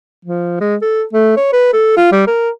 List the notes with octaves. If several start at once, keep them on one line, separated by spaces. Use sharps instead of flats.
F3
G#3
A4
A3
C#5
B4
A4
F4
G3
A#4